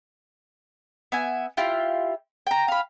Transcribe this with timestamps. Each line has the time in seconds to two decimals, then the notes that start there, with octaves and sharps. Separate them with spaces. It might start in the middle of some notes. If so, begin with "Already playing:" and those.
1.12 B3 E5 G#5
1.57 E4 F4 G4
2.47 G5 A#5
2.68 F5 B5